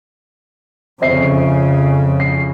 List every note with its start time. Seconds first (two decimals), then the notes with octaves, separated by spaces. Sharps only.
1.02 F2 C#3 C4 E5 C7
2.20 C7